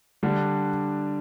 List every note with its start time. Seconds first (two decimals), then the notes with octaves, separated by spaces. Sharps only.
0.23 D3 G3 D4